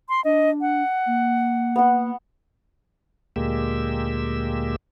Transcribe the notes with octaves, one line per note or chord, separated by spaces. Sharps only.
C6
D4 D#5
F#5
A#3
B3 F#5
D2 A#2 G#3 A#3 G4 E6